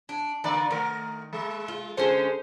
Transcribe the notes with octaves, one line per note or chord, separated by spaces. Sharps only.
D4
D3 A#3 B4 D5
D#3 A3 A#4
G#3
F4
D3 G#3 C#4 C5